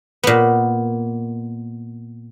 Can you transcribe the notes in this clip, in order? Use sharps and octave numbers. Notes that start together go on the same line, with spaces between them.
A#2 B3